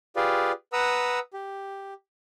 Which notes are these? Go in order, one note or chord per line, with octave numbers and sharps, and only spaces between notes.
F4 G4 G#4 B4 D5 F5
B4 F#5 A#5 D#6 E6
G4